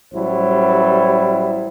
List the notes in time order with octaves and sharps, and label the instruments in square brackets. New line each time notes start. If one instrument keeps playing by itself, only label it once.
[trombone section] A1 F#3 G3 E4 C5